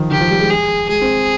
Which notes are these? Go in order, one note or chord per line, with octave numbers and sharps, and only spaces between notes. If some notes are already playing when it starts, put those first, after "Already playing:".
Already playing: D#3 F3
D#3 G4
F3
G3
G#3
G#4
G#3 G#4
C4